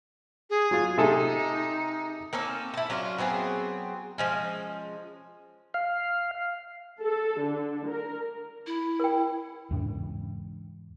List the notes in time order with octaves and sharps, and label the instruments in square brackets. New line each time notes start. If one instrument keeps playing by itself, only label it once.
[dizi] G#4
[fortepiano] F#3 F4
[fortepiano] C3 G#4 A4 [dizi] D#4
[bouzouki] A#3 C4 C#4 A4
E4 A5
F#3 C#4 D4 F4
F#3 B3 C4 G#4
F3 G#3 C#4
[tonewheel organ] F5
[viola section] A4
D3
A#4
[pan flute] E4
[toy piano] A#4 G5
[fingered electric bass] E2 G#2 C#3 D4